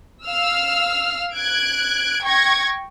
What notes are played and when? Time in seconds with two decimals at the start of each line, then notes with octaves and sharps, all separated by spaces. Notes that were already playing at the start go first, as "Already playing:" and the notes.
0.25 F5 E6 F6
1.34 F#6 G#6 D7
2.23 G5 C#6 G#6 A#6